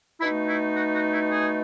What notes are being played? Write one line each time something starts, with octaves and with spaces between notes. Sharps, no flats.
B2 A3 D#4 E4
E4
F#4
F#4
E4
G#4